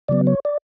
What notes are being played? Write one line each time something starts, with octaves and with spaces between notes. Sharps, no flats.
C#3 F#3 B3 D5
C#5
D5